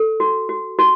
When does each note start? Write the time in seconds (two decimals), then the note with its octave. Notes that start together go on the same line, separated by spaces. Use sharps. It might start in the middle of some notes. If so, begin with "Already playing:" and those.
Already playing: A4
0.20 F#4
0.49 F#4
0.79 F#4